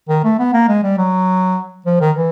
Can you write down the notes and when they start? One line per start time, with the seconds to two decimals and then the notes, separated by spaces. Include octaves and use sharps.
0.09 D#3
0.24 A3
0.39 B3
0.54 A#3
0.68 G#3
0.83 G3
0.98 F#3
1.86 F3
2.01 D#3
2.16 E3